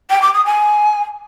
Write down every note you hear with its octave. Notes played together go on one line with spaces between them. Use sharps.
G5
D6
D#6
G#5